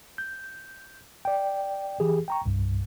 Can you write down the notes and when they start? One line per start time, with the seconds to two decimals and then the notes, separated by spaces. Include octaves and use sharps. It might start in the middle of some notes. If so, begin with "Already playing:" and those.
0.18 G6
1.25 D5 G5
2.00 E3 G4 G#4
2.28 G5 A#5 C#6
2.46 C2 G2